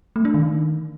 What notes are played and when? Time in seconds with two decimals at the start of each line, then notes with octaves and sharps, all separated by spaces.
0.16 A3
0.25 D4
0.34 D#3